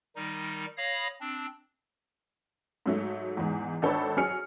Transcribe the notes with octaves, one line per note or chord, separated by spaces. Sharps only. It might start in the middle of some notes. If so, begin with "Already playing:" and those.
D#3 G3 D#4
C#5 F5 B5 D#6 A#6
C4 D4
G#2 F#3 A3
E2 G#2
G#1 D4 A4 B4 C#5 B5
F#3 G#4 F6 C#7